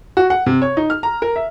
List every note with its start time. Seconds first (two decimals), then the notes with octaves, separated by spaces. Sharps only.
0.17 F#4
0.30 F#5
0.46 C3
0.62 C#5
0.77 D#4
0.90 F6
1.03 A#5
1.22 A#4
1.36 E5